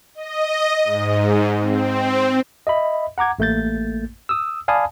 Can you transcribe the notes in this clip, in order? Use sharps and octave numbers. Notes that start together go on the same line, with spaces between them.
D#5
G#2
C4
D#5 E5 B5
F#5 A#5 D6 G#6
A1 A3 A#3 G6 A6
D#6 E6
D5 F5 G#5 A5 B5 D#6